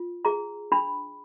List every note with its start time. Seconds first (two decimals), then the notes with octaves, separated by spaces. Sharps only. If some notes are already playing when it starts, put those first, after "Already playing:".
Already playing: F4
0.25 G#4 A#5
0.72 D4 B5